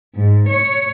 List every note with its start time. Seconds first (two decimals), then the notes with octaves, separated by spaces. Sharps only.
0.15 G#2
0.48 C#5